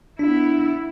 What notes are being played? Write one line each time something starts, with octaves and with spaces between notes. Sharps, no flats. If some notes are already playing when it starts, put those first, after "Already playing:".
B3 D4 E4